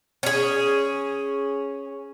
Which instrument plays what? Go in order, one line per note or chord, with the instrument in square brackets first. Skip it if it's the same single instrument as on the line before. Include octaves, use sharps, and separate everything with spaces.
[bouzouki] C#4 G#4